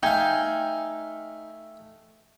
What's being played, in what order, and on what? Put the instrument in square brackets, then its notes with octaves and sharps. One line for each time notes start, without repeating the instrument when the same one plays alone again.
[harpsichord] A3 F5 [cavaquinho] D#4 G5 G#5